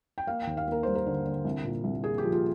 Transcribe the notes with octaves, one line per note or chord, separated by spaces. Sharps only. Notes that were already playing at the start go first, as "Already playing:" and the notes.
G5
A#3 F5
D#2 G5
F5
A#3 A#4
G3 C5
A#4
D3
D3
C2
A#2
C2
A#3 G#4
G4
F3
F4